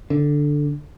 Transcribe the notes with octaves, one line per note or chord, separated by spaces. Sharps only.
D3